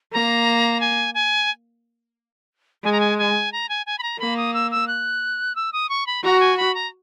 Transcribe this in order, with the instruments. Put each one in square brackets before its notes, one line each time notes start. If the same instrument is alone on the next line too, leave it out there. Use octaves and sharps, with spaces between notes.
[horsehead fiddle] A#3 [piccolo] A#5
[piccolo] G#5
G#5
[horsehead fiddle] G#3 [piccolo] G#5
[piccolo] A#5
G#5
G#5
A#5
G#5
G#5
B5
A#5
[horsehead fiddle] A#3 [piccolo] B5
[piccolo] D#6
E6
E6
F#6
E6
D#6
C#6
B5
[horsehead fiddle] F#4 [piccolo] A#5
[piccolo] G#5
B5
A#5